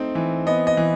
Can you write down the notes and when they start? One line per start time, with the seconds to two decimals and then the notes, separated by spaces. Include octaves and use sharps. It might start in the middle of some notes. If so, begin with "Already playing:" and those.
Already playing: A3 C4 D#4 C5
0.15 E3
0.47 B3 D#5
0.67 D#5
0.77 E3